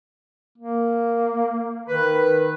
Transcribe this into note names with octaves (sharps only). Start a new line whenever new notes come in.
A#3
D#3 B4